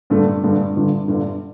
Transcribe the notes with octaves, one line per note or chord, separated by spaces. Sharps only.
G2 D3 A3
G2 D3 A3
G1 G2 D3
G1 G2 D3